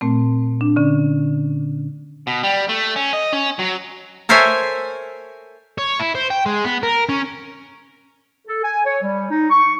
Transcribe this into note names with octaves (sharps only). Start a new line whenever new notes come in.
A#2 A3 C4
D4
D3 C#4
B2
G3
A3
C#4
D#5
C#4
F#3
A4 A#4 C5 C#5 E5 G#5
C#5
E4
C5
G5
G#3
B3
A#4
C#4
A4
G#5
C#5
G3
D#4
C#6